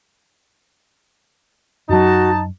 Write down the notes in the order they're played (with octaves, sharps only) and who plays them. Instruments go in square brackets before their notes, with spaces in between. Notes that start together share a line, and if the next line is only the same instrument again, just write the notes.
[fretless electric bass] F#2 F#3 [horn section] D#4 A5 [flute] F#4